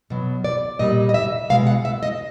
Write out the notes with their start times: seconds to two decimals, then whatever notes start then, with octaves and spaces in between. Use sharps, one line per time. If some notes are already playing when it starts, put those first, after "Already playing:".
0.10 B2 F#3
0.44 D5
0.79 A#2 G3 D#5
1.09 D#5
1.14 E5
1.50 B2 G#3 F5
1.67 F#5
1.85 E5
2.03 D#5